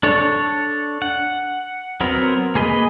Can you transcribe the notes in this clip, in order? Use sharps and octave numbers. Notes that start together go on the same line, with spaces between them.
D4 A4 C#5
F#5
F#3 B3 C4 A#4
A#3 G#4 B4 D#5